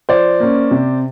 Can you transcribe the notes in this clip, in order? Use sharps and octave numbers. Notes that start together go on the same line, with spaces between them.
F3 C5 D5
A#3 C#4
C3